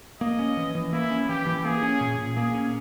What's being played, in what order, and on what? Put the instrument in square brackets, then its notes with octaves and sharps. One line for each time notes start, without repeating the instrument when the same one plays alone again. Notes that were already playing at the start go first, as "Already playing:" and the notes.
[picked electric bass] A#3 [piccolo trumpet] D#5
[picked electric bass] C#4
E3
E3
[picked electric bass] A#3 [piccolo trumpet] E4
[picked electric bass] C#4
[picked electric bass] E3 [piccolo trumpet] G4
[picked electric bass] E3
[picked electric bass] A#3 [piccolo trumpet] G#4
[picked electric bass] C#4
A#2
A#2
[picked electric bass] A#3 [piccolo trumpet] G#4
[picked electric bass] C#4